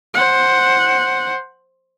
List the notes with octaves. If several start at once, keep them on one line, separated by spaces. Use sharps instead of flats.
C5 F#5